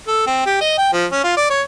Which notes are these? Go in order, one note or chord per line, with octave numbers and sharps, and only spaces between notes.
A4
C4
G4
D#5
G5
F3
C#4
F4
D5
C#5